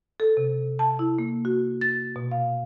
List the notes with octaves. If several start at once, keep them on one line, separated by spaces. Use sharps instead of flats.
A4
C3
A5
E4
A#3
F#4
A6
B2
F5